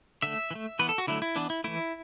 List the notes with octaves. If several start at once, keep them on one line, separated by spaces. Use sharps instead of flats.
D3 A3 E5
E3
A3
E3 B3 B4
A4
F#4
D3 F#3 A3 E4
E4
E3 B3 D4
E4
E3 A3 E4